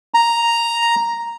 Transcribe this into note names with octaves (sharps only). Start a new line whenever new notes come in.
A#5